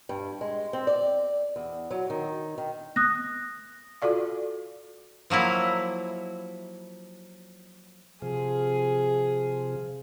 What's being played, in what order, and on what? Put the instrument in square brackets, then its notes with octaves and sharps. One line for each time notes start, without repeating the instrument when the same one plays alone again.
[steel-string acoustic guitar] G2
G#3
C4
D5
E2
F#3
D#3
D#3
[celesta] D#6 F#6 A#6
[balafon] F4 F#4 A4 D5 F5
[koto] F3 F#3 A#3 E4
[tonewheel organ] C3 F3 [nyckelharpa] G#4